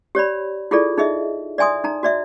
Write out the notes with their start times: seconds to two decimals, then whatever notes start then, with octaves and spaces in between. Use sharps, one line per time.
0.15 G4 C#5 D5 B5
0.71 E4 F4 G#4 A4 D5
0.98 D#4 G#4 D#5 E5
1.58 D5 E5 G#5 C6 D#6
1.84 D#4 A#5
2.03 F#4 D5 E5